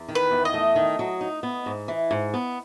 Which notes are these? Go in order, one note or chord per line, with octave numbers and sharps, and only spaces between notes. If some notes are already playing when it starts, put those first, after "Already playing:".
Already playing: E2
D#3
B4
E2
D#5
A3
D#3
F#3
D#4
B3
G#2
E3
G#2
B3